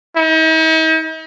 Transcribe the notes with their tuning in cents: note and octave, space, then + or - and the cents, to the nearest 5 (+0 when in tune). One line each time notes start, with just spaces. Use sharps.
D#4 +45